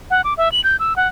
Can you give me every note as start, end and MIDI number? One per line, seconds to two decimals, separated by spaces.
0.10 0.21 78
0.24 0.34 86
0.37 0.51 76
0.52 0.61 102
0.64 0.76 91
0.80 0.96 88
0.96 1.08 78